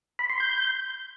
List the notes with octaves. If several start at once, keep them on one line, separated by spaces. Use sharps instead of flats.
B5
C6
G6